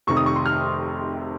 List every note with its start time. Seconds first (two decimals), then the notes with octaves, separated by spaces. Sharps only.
0.07 F1 F2 C3 D#3 C#6
0.17 D#6
0.26 C#6
0.36 C6
0.46 F6